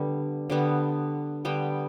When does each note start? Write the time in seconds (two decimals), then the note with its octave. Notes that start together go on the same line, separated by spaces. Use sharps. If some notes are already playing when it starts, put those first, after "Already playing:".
Already playing: D3 G3 B3
0.50 D3 G3 B3
1.45 D3 G3 B3 G5